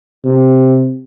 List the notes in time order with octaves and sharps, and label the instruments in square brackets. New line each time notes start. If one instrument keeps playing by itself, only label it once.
[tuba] C3